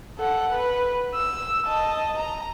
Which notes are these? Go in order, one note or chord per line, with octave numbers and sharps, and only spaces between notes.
A4 F#5
B4
E6
D#5 A5
A#5